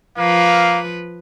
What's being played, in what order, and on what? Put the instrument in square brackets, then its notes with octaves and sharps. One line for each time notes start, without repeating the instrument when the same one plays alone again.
[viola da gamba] F3 B4 [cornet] A#3 [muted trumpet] F5